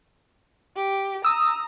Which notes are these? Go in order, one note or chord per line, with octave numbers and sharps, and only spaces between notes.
G4
A#5 D#6 E6